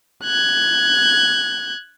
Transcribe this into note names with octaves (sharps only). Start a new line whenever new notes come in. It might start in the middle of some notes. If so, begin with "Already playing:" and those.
F#6 G#6